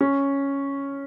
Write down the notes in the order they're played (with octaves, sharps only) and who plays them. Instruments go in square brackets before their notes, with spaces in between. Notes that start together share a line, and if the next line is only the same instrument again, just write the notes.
[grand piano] C#4